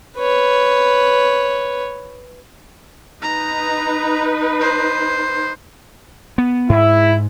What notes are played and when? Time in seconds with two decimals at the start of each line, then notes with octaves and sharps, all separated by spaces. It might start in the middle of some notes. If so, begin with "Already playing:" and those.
0.17 B4 C#5
3.22 D#4 B4 A#5
4.60 C5
6.38 B3
6.69 G#2 E4